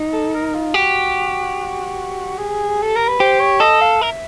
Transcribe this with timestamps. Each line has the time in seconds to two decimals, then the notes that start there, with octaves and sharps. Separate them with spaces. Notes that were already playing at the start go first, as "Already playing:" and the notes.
Already playing: D#4
0.13 A4
0.35 A#4
0.54 F4
0.74 F#4 G4
2.38 G#4
2.82 A4
2.95 A#4
3.08 B4
3.20 G4 C5
3.40 C#5
3.60 A4 D#5
3.81 F5
4.01 A#4 E5